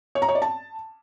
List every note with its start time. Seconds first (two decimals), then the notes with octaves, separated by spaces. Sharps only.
0.15 C#5
0.22 A#5
0.29 C#5
0.35 D5
0.42 A5